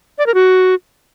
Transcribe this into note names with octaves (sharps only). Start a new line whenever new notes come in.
D5
A#4
F#4